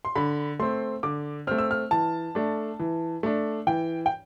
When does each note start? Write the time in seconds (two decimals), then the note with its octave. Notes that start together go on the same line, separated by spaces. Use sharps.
0.05 C6
0.15 D3 B5
0.59 A3 C4 C6
1.03 D3 D6
1.47 A3 C4 F6
1.58 E6
1.71 F6
1.91 E3 A5
2.35 A3 D4
2.79 E3
3.23 A3 D4
3.67 E3 G5
4.06 G5